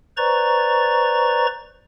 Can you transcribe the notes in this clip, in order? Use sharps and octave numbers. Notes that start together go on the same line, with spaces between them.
B4 C5 D5 A#5 C#6 A6